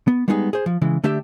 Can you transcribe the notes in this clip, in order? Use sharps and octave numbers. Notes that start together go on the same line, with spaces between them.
B3
G3 G#3 B3 D#4 F4 G#4
G#4 C5
F3
C#3 E3 G#3
D3 A3 D4 G4 E5